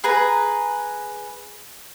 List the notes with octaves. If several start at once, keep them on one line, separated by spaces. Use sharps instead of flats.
G#4 B4 A#5